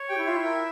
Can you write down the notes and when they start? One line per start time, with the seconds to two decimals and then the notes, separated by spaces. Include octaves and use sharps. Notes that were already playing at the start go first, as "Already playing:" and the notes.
Already playing: C#5
0.09 G4 G5
0.18 E4
0.27 F4 E5
0.37 E4
0.44 A#4